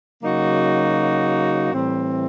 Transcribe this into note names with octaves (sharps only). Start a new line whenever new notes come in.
C#3 F#3 A#3 D#4 F#4
A2 E3 G3 C4